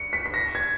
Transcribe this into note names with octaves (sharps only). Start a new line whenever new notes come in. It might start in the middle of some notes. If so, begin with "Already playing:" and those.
Already playing: C#7
B6
B6
A#6
G#6